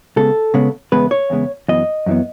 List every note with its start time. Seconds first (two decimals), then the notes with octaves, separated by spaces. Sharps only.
0.16 C#3 G#3 B3 A4
0.54 C#3 G#3 B3
0.92 E2 C#3 G#3 B3 B4
1.11 C#5
1.30 E2 C#3 G#3 B3
1.68 F#2 E3 B3 D#5
2.06 F#2 E3 B3